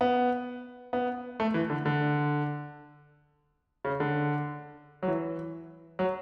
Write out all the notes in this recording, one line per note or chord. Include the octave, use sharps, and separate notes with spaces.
B3
B3
A3
E3
D3
D3
C#3
D3
F#3
E3
F#3